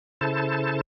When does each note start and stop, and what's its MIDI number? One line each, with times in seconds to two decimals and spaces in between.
0.21 0.81 49
0.21 0.81 64
0.21 0.81 69
0.21 0.81 72
0.21 0.81 81